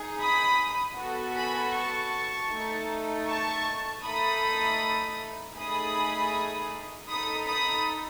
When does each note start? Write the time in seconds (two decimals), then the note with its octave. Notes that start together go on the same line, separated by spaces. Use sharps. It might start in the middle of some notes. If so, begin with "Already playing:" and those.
Already playing: D#4 G#4
0.20 B5 D#6
0.97 B3 F#4 A4
1.35 G#5 B5
1.73 A5 C#6
2.50 A3 D#4 A4
3.26 A5 C#6
4.03 A3 D#4 A4 B5 D#6
5.55 A3 D#4 G#4 B5 D#6
7.08 D#4 A4 B5 D#6
7.47 B5 D#6